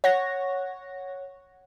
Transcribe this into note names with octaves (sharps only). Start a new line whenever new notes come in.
C#5 F#5 A#6